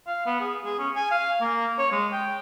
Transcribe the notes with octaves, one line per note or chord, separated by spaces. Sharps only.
F5
B3
G#4
G#4
C#4
G#5
F5
A#3
C#5
G#3
G5